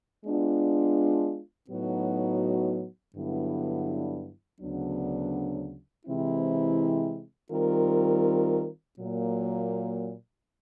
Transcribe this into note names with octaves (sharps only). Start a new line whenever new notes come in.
G#3 B3 D4 F4
A2 F#3 B3 D#4 F#4
G2 D3 F#3 B3 E4
D2 C#3 F#3 B3 D4
C3 E3 G#3 C4 E4
D#3 G3 C4 F4 A#4
A#2 F#3 A#3